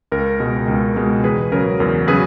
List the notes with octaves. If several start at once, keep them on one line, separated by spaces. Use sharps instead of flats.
C#2 A#4
B2 G#3
C#2
B2 G#3
E2 G#4 B4
C#3 F#3 A#4
E2 A#4
C#3 F#3 G#4 B4